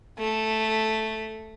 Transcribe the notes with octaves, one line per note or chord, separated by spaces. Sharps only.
A3